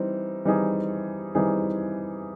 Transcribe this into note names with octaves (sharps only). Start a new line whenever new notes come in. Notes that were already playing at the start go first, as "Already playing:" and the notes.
Already playing: E3 G3 C4 D#4
E3 G3 C4 D#4 G#4
E3 G3 C4 D#4 G#4